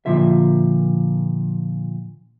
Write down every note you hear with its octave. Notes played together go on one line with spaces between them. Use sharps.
A#2 D3 F3 F4 E5